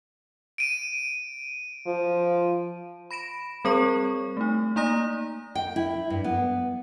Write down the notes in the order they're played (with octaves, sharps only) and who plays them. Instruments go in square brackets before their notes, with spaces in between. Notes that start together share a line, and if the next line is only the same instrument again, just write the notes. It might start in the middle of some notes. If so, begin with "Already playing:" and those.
[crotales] D7 D#7
[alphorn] F3
[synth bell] B5 A#6 D7 E7
G3 C4 G#4 A#4 C#5 C#6
A3 D#4
A#3 D#4 D5 A#5 D#6 A#6
[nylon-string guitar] G5
E4
G2
B3